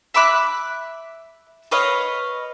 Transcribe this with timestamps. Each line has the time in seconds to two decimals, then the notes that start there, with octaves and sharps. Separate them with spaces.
0.14 E5 B5 D6 F#6
1.71 B4 C#5 D#5 F5